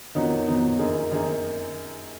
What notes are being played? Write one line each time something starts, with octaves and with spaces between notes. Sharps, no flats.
F2 D#3 F#3 B3 D#4
F2 D#3 F#3 B3 D#4
F#2 D#3 A#3 D#4 G#4
F#2 D#3 A#3 D#4 G#4